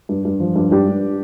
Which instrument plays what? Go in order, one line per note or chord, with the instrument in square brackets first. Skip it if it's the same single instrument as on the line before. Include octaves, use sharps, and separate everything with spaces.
[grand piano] G2
G2
F3
G2
G2 D4 G4
G3